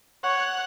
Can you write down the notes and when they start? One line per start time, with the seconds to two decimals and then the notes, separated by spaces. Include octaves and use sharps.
0.24 C#5 F#5